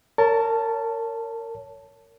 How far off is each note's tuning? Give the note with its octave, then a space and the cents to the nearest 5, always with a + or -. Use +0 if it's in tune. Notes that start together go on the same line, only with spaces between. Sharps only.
A#4 -25 C#5 +15 A5 +0